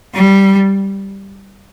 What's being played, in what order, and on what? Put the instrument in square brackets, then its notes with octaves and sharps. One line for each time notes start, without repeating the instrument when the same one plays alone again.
[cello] G3